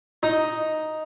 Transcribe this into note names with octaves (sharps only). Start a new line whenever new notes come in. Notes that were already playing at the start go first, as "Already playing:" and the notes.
D#4